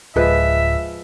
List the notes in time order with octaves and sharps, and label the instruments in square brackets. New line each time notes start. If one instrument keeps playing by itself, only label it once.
[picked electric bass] D1 [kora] F3 G#3 B4 [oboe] E5